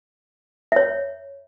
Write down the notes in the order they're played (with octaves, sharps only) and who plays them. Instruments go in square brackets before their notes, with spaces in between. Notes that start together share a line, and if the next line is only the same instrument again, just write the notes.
[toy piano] C#5 E5